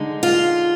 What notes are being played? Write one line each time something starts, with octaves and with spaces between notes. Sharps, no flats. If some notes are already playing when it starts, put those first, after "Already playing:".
Already playing: D3 G#3 D#4
F4